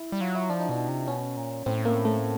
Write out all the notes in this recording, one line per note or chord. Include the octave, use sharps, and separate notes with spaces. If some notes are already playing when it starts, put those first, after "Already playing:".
Already playing: E4
G3
F#3 F4
E4
F3 D4
D#4
B2 D4
C3
B2 C#4
A#2
A2 C4
A#3
A3